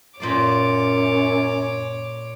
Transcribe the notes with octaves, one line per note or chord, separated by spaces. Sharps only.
F#2 A#2 A#3 C#5 D5 D6